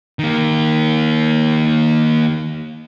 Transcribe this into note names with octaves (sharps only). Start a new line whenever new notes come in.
D#3 A#3